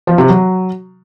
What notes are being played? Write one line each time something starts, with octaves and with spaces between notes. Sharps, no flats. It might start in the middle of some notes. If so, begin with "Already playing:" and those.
F3
C3
F#3